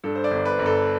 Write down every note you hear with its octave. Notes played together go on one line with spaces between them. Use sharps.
G2 A4
C5
D5
G1
B4
G1
A4